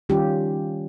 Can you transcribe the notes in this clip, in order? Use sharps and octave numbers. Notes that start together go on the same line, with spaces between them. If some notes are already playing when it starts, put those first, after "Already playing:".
D#3 G3 C#4 F4 G4